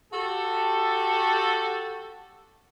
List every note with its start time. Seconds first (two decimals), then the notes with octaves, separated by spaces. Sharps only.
0.13 F#4 G4 A4